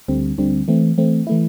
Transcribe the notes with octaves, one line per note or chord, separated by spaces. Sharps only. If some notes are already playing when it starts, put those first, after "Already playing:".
D2 D3 G3 C4
D2 D3 G3 C4
E3 A3 C4
E3 A3 C4
E3 A3 E4